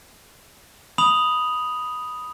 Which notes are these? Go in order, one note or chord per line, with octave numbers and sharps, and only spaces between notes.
B5 D#6 F7 F#7